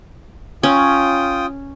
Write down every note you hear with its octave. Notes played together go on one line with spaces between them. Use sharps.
C#4 F4 G5 D#6